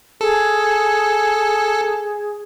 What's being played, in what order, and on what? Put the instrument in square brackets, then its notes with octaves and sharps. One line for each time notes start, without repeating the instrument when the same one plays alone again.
[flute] G#4 [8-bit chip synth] A4